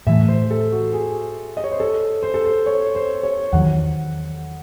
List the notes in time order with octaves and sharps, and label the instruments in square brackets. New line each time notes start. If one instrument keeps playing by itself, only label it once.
[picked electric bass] A2 E3 A3 [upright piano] E5
[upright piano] C5
A4
F#4
G#4
D#5
C#5
C5
A4
C5
A4
C5
C#5
C5
C#5
[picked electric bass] E2 D#3 F#3 [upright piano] F#5